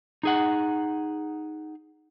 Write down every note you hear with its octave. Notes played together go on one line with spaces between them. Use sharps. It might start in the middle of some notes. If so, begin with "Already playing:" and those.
D#4 G#4 F#5